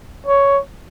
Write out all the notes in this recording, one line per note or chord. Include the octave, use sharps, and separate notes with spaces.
C#5